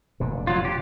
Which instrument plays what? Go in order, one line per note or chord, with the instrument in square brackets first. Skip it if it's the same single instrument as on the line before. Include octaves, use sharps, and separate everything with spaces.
[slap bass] F1 A#2 D3
[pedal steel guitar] F#3 F4
G4